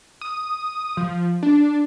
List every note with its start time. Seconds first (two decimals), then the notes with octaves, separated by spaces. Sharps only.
0.21 D#6
0.97 F3
1.43 D4